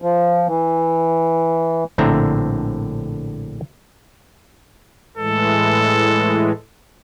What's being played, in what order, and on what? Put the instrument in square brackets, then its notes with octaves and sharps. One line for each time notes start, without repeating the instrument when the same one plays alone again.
[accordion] F3
E3
[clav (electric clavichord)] A#1 A2 D3 C4 E5 A#5
[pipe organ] A2 E3 G#3 [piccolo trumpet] A4